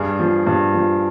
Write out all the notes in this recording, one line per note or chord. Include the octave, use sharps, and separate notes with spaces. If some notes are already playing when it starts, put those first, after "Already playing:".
Already playing: G2 G#4
F3
G2
F3